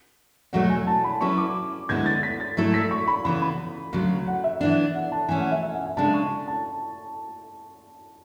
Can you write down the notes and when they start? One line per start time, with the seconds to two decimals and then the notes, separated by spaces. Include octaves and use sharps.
0.53 E2 B2 F#3 A3 F#5
0.69 G#5
0.87 A5
1.04 B5
1.21 F#3 C#4 E4 B4 C#6
1.38 D6
1.89 D2 D3 G#3 B3 E4 G#6
2.06 A6
2.23 B6
2.40 A6
2.57 G#2 F#3 A3 E4 A4
2.74 B6
2.91 C#6
3.08 B5
3.24 C#3 E3 B3 B5
3.42 B5
3.93 D2 C#3 F#3
4.27 F#5
4.44 E5
4.61 E3 B3 D4
4.95 F#5
5.12 A5
5.29 E3 A3 C#4 G#5
5.40 F#5
5.51 E5
5.63 E5
5.74 F#5
5.85 G#5
5.97 C#3 G#3 D4 A5
6.14 C#6
6.48 A5